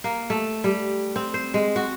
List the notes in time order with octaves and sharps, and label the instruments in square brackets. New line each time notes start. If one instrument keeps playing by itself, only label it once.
[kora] A#3
A3
G3
C4
C5
G#3
F#4